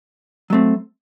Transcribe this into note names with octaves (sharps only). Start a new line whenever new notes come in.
F#3 A3 C4